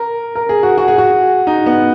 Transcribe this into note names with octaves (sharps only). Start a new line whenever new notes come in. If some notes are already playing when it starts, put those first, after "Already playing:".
Already playing: A#4
A#4
G#4
F#4
F#4
G#4
F#4
D#4
B3